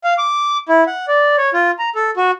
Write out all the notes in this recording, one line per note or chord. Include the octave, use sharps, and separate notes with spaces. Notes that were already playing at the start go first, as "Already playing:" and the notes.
F5
D6
E4
F#5
D5
C#5
F4
A#5
A4
F#4